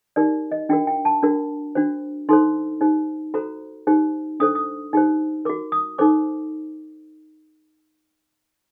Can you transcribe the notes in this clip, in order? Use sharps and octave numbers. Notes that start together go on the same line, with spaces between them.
D#4 G4 A#4 D5
D#5
D4 F#4 A#4 G5
G5
A5
D4 F#4 A#4
D4 F#4 C5
D#4 A4 C5 C6
D#4 G4 C5
F#4 A4 C5 A#5
D#4 G4 C5
D4 A4 C5 D#6
D#6
D#4 G4 C5
F#4 A#4 D6
D#6
D#4 A4 C5 D6